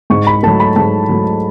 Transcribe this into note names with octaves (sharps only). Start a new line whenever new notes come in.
G#2 C#6
B5
F#3 A3 A5
B5
G#2 A5
F#3 A3